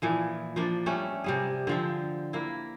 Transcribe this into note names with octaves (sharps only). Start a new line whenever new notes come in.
A#2 E3 F3
F3 A#3 D4
G3 A3 C#4
C3 G3 G#4
D3 F3 C4
A#3 E4